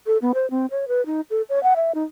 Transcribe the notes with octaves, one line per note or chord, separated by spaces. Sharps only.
A4
B3
C5
C4
C#5
B4
D#4
A4
C#5
F#5
E5
D#4